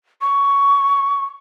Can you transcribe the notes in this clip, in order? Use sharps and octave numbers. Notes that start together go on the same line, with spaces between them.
C#6